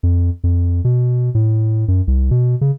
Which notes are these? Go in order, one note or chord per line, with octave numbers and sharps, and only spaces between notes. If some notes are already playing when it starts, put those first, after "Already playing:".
F2
F2
B2
A2
F#2
C2
B2
C#3